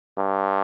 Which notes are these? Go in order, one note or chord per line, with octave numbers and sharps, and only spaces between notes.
G2